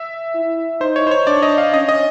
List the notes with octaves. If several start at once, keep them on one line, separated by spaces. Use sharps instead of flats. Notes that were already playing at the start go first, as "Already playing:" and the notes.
Already playing: E5
E4
D#4 C5
C#5
C5
C#5
D4 D5
D#5
F5
C#4 D#5
D#5